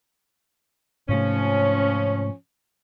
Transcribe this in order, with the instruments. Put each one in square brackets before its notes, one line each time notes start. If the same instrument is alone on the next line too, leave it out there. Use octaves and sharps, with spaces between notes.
[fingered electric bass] G#2 C3 A3 [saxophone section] F3 C#4